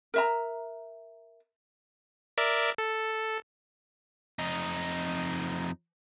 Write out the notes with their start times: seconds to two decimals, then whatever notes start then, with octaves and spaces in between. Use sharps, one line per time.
0.14 A#4 E5 A#5
2.38 A#4 D5 E5
2.78 A4
4.39 F2 D#4